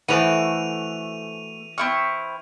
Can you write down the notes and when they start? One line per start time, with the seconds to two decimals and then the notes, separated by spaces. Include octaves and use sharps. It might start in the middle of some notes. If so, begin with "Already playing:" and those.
0.08 E3 A3 F#4 A4 C5 G#5 D#7 F7
1.78 C4 E4 C#6 F6